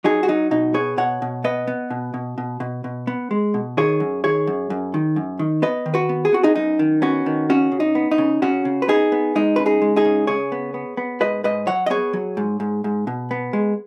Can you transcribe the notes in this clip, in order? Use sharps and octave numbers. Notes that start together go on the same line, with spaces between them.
F#3 D#4 G#4
F#4
F#3 D#4
B2 D#4
B3 G#4 C#5
B2 C#5 F#5
B2
B3 B4 D#5
B3
B2
B2
B2
B2
B2
B3
G#3
B2
D#3 G#4 C#5
F#2
D#3 G#4 C#5
F#2
F#2
D#3
F#2
D#3
B3 B4 D#5
D#3
F#4 B4
B3
G#4
B3 F#4
D#4 G#4
F#2 D#4
D#3
B3 C#4 F#4
D#3
C#3 C#4 F#4
C#3
D#4
B3
D#4
C#3
C#3 C#4 F#4
C#3
B4
B3 D#4 G#4
B3
G#3 D#4
C#3 B4
D#4 G#4
G#3
D#4 G#4
C#3
C#3 G#4 C#5
B3
B3
B3
G#2 B4 D#5
G#2 B4 D#5
F#3 C#5 F#5
D#5
B3 G#4 C#5
F#3
G#2
G#2
G#2
B2
B3
G#3